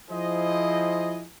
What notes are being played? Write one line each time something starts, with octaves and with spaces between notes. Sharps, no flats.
F3 E4 G#4 C5 D#5